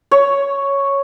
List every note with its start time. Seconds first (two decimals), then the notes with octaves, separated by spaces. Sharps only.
0.11 C#5